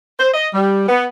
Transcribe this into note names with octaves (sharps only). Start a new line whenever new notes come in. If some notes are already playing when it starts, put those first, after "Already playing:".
C5
D#5
G3
B3